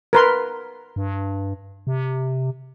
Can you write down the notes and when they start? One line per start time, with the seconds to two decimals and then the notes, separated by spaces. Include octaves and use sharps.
0.13 A#4 B4 C6
0.96 G2
1.87 C3